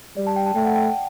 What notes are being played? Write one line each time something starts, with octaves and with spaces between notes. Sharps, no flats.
G3 D5
A5
G5
A5
A3 G5
F#5
G5